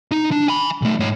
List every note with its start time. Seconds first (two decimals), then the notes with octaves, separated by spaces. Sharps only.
0.11 D#4
0.32 D4
0.48 G#5 B5
0.82 B1 A3
1.00 G#2 C#5